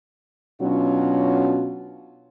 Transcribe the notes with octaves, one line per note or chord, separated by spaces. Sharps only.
B2 F#3 C#4 D4 F4 F#4